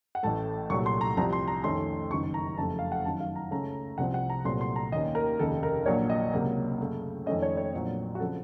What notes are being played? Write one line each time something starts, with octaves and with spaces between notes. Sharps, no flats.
F#5
A1 A2 A3 A5
C2 A#2 F#3 A3 C#6
C6
A#5
C2 C3 F3 A#5
C6
A#5
F2 D#3 A3 C#4 C6
F#1 F#2 D#3 C#6
A#5
F#1 F2 C#3 F3 A3 A5
F5
F#5
F#2 D#3 F#3 A5
F5
A#5
C#2 C#3 A3 C#4 A#5
C2 C3 F3 C4 F#5
F#5
A#5
C2 A#2 F#3 A3 C4 C6
C6
A#5
D#2 D#3 A#3 C#4 D#5
A#4
F1 D#2 C#3 A4
A#4
A#1 A#2 F#3 A#3 C#5
D#5
C#2 C3 F#3 A#3
F#2 C#3 A3
F2 D#3 A3 C#4 D#5
C#5
C#5
A#1 A#2 F#3 C4
F#4
C#3 F3 C4 A4